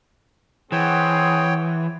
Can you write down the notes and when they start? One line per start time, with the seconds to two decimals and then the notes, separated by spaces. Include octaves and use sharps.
0.72 E3 C4 G#4 C#5 F#5 G5